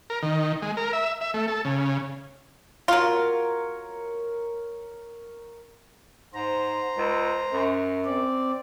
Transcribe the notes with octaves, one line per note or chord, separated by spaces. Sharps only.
A#4
D#3
G#3
A#4
E5
E5
A3
A4
C#3
F#3 F4 A#4 C#5
G#2 C5 A#5
C#2
F#2
C4 D5